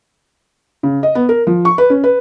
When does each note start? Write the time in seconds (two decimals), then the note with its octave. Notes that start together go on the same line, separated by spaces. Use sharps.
0.83 C#3
1.03 D#5
1.15 B3
1.29 A#4
1.47 F3
1.65 C#6
1.78 B4
1.90 C#4
2.04 B4